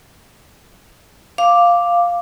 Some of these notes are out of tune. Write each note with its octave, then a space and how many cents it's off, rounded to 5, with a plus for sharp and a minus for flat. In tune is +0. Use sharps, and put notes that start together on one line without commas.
F5 +0 D6 +0